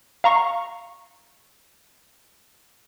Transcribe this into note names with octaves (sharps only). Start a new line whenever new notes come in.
F5 A#5 C#6